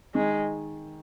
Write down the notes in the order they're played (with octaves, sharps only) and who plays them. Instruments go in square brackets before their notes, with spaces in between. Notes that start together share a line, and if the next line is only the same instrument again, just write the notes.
[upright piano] D#3 [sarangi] G#3